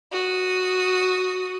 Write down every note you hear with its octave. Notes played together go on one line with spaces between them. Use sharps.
F#4 D#6